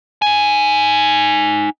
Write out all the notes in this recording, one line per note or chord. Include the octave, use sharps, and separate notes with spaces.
D#4 G#5